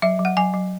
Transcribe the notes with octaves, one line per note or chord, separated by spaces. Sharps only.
F#3 E5
F#3
F#5
F#3 G#5
F#3